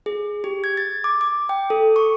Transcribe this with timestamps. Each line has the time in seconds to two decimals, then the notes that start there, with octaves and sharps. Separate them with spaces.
0.06 G#4
0.44 G4
0.64 G#6
0.77 A6
1.04 D6
1.21 D6
1.49 G5
1.70 A4
1.96 C#6